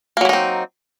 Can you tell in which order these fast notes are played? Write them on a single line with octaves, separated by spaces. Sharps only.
A#3 F#3 E4 D#4 C4